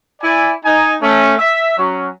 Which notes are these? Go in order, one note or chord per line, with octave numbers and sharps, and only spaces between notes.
E4 D5 G#5
D#4 G#5
A3 C#4
E5
F#3 C#4